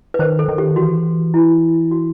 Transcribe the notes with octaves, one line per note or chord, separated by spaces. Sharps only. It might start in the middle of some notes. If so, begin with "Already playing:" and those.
B4
D#3 C5
A4
D#3
G4
E3 F#4
E4
F#4